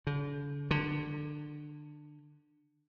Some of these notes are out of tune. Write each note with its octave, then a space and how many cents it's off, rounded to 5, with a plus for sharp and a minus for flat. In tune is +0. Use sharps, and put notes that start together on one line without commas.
D3 -45
D3 +20